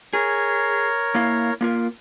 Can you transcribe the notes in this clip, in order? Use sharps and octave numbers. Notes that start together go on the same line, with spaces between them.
G#4 A#4 C#5
A#3 E4 F5
A#3 F4 A#4